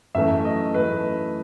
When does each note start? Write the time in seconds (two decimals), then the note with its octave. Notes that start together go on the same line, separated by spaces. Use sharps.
0.15 F#2 E3 A3 E5
0.45 D#5
0.74 F#2 E3 A3 B4